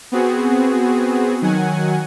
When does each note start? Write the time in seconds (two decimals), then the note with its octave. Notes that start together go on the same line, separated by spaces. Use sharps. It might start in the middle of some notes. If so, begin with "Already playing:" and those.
0.12 B3 C4 F#4 G#4
1.42 D#3 F#3 F#5 G#5